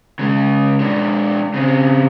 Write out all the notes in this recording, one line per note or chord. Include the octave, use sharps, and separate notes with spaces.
C#3 G#3
G#3 D4
C#3 C4